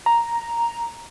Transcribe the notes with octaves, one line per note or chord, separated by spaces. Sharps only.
A#5